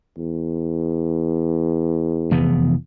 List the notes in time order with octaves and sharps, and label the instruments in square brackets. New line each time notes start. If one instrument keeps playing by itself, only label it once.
[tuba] E2
[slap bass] F1 E3 B3